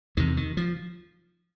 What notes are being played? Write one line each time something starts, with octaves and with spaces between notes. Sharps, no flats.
E2 C3 D#3
D#3
F3